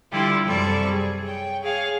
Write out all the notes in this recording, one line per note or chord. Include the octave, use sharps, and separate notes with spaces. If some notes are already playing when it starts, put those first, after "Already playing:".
D3 G3 E4 F4 G4
F#2 C3 G3 A4 D5 C#6
G#4
C#5 G5
G#4 C#5 F5